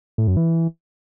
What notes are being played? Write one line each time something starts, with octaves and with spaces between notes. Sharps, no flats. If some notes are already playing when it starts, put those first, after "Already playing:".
A2
F#2
E3